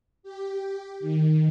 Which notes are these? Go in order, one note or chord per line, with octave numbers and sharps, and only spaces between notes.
G4
D#3